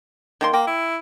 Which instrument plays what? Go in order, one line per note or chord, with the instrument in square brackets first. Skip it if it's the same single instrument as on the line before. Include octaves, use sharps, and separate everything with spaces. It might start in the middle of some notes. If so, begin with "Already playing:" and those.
[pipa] D#3 A#3 C6
[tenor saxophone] A#3 [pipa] G5
[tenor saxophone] E4